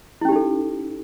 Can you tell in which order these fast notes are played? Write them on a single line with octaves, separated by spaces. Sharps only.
E4 C#4 G4 D#4 A4